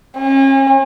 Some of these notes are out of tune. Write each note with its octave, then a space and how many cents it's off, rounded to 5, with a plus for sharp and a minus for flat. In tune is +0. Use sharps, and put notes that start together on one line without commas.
C#4 -40